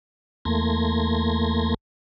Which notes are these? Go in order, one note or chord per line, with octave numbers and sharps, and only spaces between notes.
E2 A3 A#3 C6 G#6 A#6